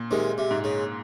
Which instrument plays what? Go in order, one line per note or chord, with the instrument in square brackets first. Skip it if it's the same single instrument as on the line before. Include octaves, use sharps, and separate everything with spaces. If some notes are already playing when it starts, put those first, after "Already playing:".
Already playing: [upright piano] A#2
[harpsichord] C3 D#3 [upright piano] G#3
[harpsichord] C3
[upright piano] G#2
[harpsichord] C#3